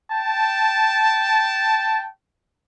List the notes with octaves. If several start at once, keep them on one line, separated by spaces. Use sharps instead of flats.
G5 A5